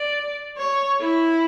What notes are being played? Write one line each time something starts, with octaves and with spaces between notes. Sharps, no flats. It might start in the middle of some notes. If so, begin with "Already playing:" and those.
Already playing: D5
C#5
E4